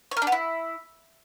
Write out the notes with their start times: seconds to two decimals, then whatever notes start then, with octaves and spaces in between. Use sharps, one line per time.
0.11 C#5
0.17 A#4
0.22 D4
0.27 B3
0.32 E4